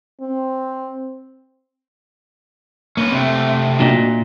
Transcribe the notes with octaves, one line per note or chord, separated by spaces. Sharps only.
C4
A#3 C#4 B4
C3 A3 C4
A#2 D4 F#4 D#5